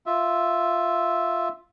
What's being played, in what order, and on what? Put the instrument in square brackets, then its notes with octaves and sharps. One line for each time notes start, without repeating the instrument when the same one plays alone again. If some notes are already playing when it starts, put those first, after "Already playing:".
[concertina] F4 E5